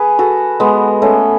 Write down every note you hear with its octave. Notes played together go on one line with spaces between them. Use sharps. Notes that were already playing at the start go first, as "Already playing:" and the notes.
Already playing: G#4 B4
F#4 A4
G#3 B3
A3 C#4